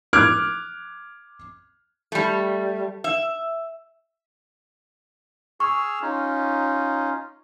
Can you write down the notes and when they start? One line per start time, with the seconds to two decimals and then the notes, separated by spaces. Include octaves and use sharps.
0.13 D6 F6 F#6 G#6 D7
2.12 G3 A3
3.04 E5
5.60 G#4 C#6 E6 F6
6.02 C#4 D#4 F4